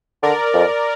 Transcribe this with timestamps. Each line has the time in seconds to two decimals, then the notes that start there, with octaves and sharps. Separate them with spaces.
0.23 D3 A#4 D5
0.54 F2